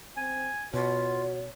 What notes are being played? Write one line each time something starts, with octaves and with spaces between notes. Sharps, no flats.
C4 G#5
B2 F4 F#4 C#5